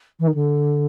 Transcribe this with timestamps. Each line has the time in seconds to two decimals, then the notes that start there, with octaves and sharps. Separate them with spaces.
0.19 E3
0.27 D#3
0.34 D3